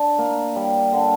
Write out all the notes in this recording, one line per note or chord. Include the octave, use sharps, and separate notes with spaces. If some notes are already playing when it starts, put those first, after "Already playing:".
Already playing: D4
A#3
G3
D3